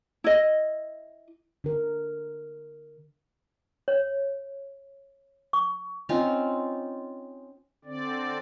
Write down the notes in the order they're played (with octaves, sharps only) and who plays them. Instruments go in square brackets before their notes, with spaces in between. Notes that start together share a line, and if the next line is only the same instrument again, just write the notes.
[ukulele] E4 D#5
[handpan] D3 A#4
[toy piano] C#5
C#6
[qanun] C4 C#4 D#4 F4
[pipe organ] D3 C4 D5